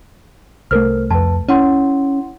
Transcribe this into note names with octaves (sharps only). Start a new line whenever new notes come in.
C2 A3 A#4 C5 F6
F2 B4 A5
C#4 E4 F#5 C6